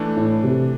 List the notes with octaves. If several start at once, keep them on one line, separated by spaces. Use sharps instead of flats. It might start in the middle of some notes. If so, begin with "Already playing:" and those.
Already playing: E3 A3 D4
A2
C3